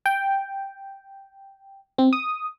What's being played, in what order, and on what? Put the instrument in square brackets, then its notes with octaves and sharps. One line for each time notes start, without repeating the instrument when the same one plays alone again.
[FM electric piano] G5
C4
D#6